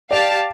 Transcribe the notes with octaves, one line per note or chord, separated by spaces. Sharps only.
G4 D5 F5 A5